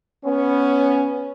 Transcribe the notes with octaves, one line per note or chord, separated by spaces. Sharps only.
B3 C#4